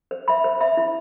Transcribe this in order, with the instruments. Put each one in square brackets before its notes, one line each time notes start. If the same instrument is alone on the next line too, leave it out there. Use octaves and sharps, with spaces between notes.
[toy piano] C5
E5 B5
C5
E5 B5
E4